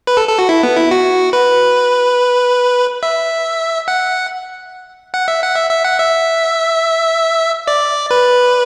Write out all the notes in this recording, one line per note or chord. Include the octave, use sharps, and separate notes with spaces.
B4
A4
A4
F#4
E4
B3
E4
F#4
B4
E5
F#5
F#5
E5
F#5
E5
E5
F#5
E5
D5
B4